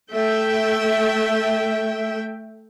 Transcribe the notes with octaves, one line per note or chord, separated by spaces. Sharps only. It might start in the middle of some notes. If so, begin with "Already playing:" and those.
A3 E5 G5